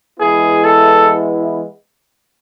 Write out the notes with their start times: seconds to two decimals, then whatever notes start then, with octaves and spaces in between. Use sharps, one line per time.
0.20 E3 G#3 B3 E4 G#4
0.64 A4